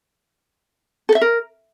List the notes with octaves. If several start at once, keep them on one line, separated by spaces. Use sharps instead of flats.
A4
E5
A#4